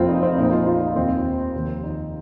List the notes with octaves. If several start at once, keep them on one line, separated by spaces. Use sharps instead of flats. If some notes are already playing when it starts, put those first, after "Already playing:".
Already playing: F1 F2 F3 A#3 C4 F4
D#4
C4
A#1 A#2 A#3 D#4
F4
F4
D#4
D#2 D#3 A#3 C4
F1 D#2 D#3 A#3
D#4